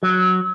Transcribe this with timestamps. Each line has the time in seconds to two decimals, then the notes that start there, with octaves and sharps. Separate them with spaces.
0.03 F#3